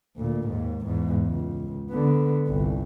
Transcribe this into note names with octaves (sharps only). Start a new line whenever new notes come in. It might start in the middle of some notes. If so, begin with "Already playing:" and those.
D2 A#2
D#2 G#2
E2 G#2
C#2
D3 B3
G1 C2